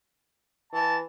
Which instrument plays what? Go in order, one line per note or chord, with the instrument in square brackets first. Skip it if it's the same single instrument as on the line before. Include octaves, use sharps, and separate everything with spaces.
[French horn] E3 [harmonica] A5